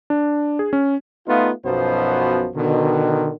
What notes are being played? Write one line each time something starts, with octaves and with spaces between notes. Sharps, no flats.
D4
G#4
C#4
A3 B3 D#4 F4
B1 F#2 B2 F3 B3 C5
B2 D3 D#3